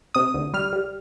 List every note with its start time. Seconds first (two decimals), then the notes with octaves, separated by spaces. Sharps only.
0.14 C3 D#6
0.34 D2
0.54 G3 F6
0.73 G3